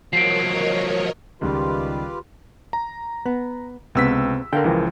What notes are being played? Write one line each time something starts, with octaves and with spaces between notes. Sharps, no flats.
F3 F#3 A#4 C#5 D#5 C7 D7
C#2 D#3 G3 F4 G4 B4
A#5
B3
C#2 C3 B3 C4 E6 B6
D3 A#4 F5 G5
C#2 E3 F3